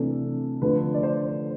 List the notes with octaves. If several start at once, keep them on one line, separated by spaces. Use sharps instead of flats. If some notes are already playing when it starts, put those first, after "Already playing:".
Already playing: C3 E3 A3 D4 A4
D3 F3 A3 B4
D5
C5